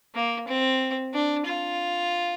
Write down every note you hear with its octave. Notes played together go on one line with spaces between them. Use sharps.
A#3
C4
D4
F4